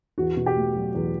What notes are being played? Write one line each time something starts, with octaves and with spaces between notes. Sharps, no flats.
E2 F#4
B2
G4
A3
F#3
E2